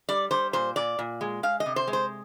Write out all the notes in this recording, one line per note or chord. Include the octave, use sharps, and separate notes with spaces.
G3 D5
G3 C5
A#2 C5
A#2 D5
A#2
G#3
G#3 F5
D#5
C3
C5
G#3
C5